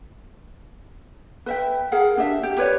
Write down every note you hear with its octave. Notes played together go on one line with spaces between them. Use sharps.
B4 E5 G5
G#4 A#4 F5 F#5
D4 G4 E5
G4
G4 B4 C#5 D5